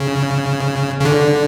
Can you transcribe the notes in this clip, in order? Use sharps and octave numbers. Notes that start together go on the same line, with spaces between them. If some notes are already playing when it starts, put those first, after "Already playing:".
Already playing: C#3
C#3
D3